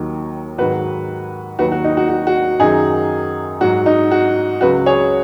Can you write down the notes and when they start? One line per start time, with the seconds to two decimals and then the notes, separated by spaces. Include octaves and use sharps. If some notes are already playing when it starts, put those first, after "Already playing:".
Already playing: D#2 D#3 F#3
0.58 G#2 D#3 F#3 F#4 B4
1.59 D#2 D#3 F#3 F#4 B4
1.72 F#4
1.84 D#4
1.97 F#4
2.09 F#4
2.27 F#4
2.59 F#2 D#3 F#3 D#4 G#4
3.61 G#2 F#3 F#4
3.86 D#4
4.11 F#4
4.61 C#2 C#3 F#3 F#4 B4
4.86 G#4 C#5